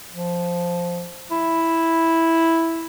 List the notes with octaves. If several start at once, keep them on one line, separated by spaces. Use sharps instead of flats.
F3
E4